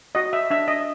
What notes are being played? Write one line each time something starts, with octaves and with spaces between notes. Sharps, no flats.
F#4 D#5
E5
D4 E5
D#5